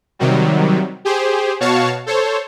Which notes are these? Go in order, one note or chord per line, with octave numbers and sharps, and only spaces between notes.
C3 D#3 F#3 G3
G4 G#4 C5
B2 F#4 C#5 F5 A5 C#6
A4 C5 C#5